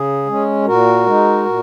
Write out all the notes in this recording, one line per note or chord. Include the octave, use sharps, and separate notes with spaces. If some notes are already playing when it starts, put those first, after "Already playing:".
Already playing: C#3 G#4
G#3 C#4
A#2 F#4 A#4
G#3 D#4
A#2